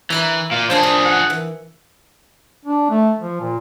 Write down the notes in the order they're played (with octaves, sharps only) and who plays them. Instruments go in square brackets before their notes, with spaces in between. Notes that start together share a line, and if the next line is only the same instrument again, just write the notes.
[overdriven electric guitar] E3 [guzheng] E4 E5 A#5
[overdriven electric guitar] A#2 [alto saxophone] F5
[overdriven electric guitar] F3 G#4 [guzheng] D4 A5 C6 [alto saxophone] C5
[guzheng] D#5
[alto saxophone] F#5
[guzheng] E3
[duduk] D4
A3
F3
A#2